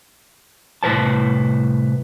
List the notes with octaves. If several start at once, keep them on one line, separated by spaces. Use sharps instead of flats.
C2 A2 B4 C5 A5